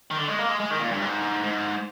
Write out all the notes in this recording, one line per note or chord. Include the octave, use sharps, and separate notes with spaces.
D#3
D3
G#3
A#3
G#3
G#3
D#3
A#2
G2
G#2
G#2